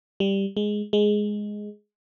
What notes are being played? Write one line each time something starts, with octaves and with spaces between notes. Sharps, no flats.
G3
G#3
G#3